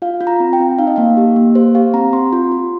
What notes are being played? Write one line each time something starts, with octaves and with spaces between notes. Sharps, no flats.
F4 F5
F4
A#5
C4
G5
C4
D#4 F5
D#5
A#3 F5
G4
A#3
G4 C5
G4 F5
C4 A#5
C4 C6
F4
F4